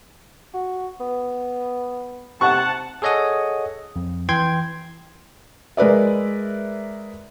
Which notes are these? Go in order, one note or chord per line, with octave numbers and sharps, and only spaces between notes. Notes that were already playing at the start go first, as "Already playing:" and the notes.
F#4
B3
C3 F#5 A5 C#6
G#4 A4 C#5 D#5 F#5 D#6
F2
E3 G5 C6 G#6
G#3 A#4 B4 D5 E5